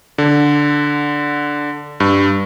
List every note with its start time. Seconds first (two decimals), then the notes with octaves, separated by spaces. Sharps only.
0.18 D3
2.00 G2